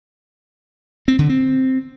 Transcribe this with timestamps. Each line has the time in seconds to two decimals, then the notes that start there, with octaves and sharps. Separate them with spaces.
1.08 C4
1.19 D3
1.29 C4